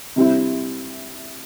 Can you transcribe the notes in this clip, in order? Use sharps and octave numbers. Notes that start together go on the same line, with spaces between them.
C3 G3 C4 E4